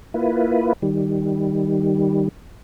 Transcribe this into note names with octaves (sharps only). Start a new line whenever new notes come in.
A#3 E4 F4 B4
D#3 G3